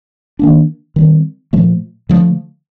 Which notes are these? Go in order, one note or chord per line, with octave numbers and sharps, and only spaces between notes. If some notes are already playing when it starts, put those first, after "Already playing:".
D#3 A#3 D4
D#3 G3 C4
A#2 F3 A3
D3 F3 A3